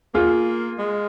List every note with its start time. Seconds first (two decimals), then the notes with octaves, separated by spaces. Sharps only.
0.14 A#3 F4 G#4
0.79 G#3